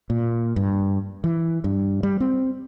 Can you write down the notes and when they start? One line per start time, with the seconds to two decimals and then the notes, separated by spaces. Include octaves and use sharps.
0.10 A#2
0.56 G2
1.24 E3
1.64 G2
2.03 G3
2.20 C4